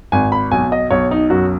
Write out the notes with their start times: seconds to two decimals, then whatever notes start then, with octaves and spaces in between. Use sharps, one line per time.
0.12 G#1 G#5
0.32 B5
0.52 B1 G#5
0.72 D#5
0.90 B1 C#5
1.11 D#4
1.30 F#2 F#4